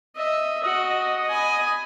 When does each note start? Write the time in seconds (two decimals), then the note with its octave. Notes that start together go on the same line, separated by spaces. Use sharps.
0.16 D#5 E5
0.64 F#4 D#5
1.29 G#5 B5